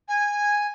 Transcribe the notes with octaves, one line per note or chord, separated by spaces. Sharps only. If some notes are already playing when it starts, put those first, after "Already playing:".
G#5